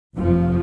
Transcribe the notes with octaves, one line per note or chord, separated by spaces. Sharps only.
F1 F2 C3 F3